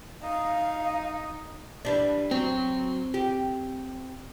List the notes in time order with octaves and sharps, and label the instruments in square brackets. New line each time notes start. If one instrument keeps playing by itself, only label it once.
[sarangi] D#4 [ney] F5
[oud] E3 G3 D4
[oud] F#3 [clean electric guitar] C4
[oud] G4